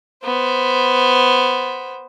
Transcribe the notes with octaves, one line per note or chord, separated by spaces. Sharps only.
B3 C5